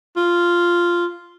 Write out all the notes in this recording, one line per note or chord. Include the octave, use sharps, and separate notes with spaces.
F4